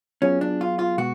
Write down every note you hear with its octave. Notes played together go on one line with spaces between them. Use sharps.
F#3 B3 C#4 F4 G#4
D4
F4
F4
B2 G#3 B3 F#4